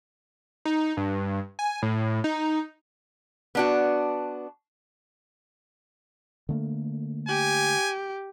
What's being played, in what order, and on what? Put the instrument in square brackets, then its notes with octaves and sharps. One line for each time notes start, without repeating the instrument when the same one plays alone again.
[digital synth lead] D#4
G2
G#5
A2
D#4
[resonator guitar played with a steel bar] B3 D4 F#4
[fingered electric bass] D3 A3 A#3
[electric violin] G4 [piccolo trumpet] G#5